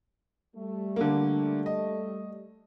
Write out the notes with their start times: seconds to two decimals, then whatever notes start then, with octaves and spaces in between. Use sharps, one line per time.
0.56 G3 A3
0.96 D3 A#3
1.66 D#5